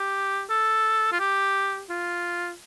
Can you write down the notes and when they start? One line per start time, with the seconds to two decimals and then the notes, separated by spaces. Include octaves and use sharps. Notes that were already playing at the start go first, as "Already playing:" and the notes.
Already playing: G4
0.50 A4
1.12 F4
1.20 G4
1.90 F4